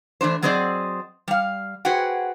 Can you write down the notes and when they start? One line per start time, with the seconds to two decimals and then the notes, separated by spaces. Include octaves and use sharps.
0.21 E3 A3 D4 C5
0.42 F#3 C4 G#4 C5 D5 D#5
1.28 G3 F5
1.85 F#4 G#4 B4 C5 F#5 G5